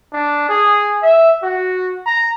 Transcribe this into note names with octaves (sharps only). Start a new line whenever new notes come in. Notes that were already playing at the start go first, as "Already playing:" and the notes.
D4
G#4
E5
F#4
A#5